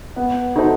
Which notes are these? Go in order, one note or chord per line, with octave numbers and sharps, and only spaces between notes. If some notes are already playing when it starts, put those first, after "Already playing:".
B3
D#4 F#4 A4 C5